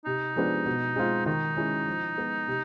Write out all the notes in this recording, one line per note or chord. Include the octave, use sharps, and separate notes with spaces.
C3 D#4
F3 G#3 B3 D4
B2
G#3 C4 F4
D#3 D#4
G#3 C#4 E4
F3
G#3 B3
C3